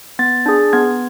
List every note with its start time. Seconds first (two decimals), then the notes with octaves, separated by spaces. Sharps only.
0.19 B3 A6
0.46 D4 G#4
0.73 B3 G#6